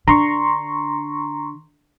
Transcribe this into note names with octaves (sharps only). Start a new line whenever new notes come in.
D3 A#5 C6 C#6